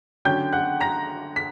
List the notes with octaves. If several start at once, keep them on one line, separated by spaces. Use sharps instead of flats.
D3 F#3 C#4 G5 G6
F#5 F#6
A#5 A#6
B6